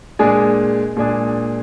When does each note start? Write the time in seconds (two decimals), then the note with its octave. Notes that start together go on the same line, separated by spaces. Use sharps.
0.19 A#2 G#3 D4 G#4
0.96 A#2 G#3 D4 G#4